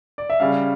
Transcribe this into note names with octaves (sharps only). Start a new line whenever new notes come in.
D5
E5
C#3 G3 C#4 F5